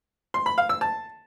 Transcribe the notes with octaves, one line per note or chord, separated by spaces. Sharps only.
C6
B5
F5
E6
A5